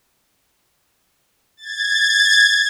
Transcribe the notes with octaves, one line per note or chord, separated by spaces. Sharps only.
G#6 A6